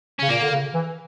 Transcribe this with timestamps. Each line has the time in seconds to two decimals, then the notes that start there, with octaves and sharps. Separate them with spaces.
0.19 C#3 C#4
0.29 A#2 A#3
0.42 D3
0.51 C#3
0.74 E3